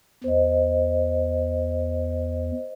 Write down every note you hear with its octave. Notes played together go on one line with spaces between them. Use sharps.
E2 C5 D#5